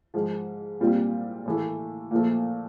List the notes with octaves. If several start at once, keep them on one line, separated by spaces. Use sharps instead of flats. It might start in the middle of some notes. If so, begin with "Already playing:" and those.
G#2 F3 G#3
A#2 G3 C4 F4
A2 E3 A3
A#2 F3 A3